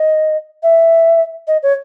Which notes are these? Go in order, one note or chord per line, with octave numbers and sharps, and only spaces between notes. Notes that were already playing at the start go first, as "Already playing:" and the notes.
Already playing: D#5
E5
D#5
C#5